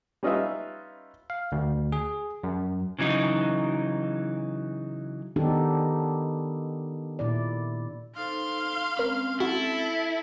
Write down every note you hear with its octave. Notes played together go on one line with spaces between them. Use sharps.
G3 C#4 D#4 F4 B4 E5
F5
D2
G#4
F#2
C#3 E3 F#3 D#4
D#3 B3 D4 D#4 G4 A4
A#2 E4 D5
D#4 A4 C5 F5 C6
G#3 C4 C#4 A#4 B5
E4 F#4 A4